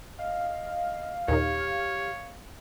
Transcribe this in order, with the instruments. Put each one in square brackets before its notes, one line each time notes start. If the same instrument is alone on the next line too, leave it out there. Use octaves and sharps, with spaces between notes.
[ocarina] D#5 [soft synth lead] F5
[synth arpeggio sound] D#2 A#2 D#4 [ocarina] G4 [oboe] C#5